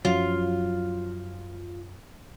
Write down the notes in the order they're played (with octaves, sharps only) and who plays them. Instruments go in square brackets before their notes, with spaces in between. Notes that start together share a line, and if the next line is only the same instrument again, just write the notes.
[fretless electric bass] F#2 F3 F#3 [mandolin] F4